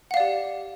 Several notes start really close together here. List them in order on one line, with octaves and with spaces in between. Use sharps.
F#5 F5 D5 G4